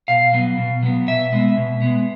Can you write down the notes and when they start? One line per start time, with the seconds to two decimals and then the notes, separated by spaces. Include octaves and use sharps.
0.08 B2 F5
0.33 F#3 B3
0.58 B2
0.83 F#3 B3
1.08 B2 E5
1.32 G#3 B3
1.57 B2
1.82 G#3 B3